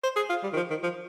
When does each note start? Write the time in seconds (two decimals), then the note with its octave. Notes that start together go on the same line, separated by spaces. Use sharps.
0.03 C5
0.16 G#4
0.29 F4
0.43 G3
0.53 D#3
0.56 F3
0.70 D#3
0.83 F3